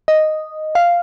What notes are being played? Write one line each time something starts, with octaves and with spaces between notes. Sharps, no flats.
D#5
F5